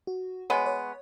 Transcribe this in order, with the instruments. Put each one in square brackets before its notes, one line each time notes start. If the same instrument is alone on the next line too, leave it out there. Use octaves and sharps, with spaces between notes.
[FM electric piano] F#4
[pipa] G#3 B3 [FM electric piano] C#5
[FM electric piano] C#5